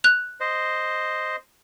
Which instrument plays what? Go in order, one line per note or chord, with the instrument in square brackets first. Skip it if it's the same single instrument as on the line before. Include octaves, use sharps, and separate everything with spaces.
[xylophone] F#6 F7
[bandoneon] C5 D#5